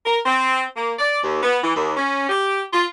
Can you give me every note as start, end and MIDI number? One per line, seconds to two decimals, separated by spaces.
0.05 0.18 70
0.25 0.63 60
0.75 0.92 58
0.98 1.19 74
1.23 1.39 39
1.43 1.57 59
1.62 1.75 52
1.76 1.96 39
1.97 2.28 61
2.28 2.62 67
2.72 2.85 65